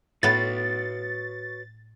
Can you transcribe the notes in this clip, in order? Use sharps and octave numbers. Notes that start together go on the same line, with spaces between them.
A2 B3 F#4 B4 C#5 A6